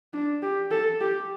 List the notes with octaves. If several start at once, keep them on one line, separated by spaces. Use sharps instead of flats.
D4
G4
A4
G4